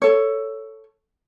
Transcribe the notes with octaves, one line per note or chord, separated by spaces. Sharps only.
A4 C#5